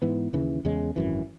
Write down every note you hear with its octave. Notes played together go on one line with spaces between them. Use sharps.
G#2 E3 B3
D#2 C#3 E3
E2 C#3 G#3
G#1 F#2 E3